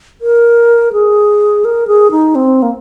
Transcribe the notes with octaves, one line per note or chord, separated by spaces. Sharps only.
A#4
G#4
A#4
G#4
D#4
C4
A#3